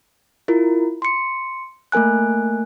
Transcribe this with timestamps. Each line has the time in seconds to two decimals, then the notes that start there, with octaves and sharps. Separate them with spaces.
0.48 E4 F4 A#4
1.02 C6 C#7
1.92 A3 A#3 A#4 G#5 F#6